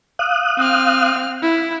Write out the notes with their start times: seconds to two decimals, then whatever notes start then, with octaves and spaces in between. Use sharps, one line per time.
0.19 F5 D#6 F#6
0.58 C4 F6
1.43 E4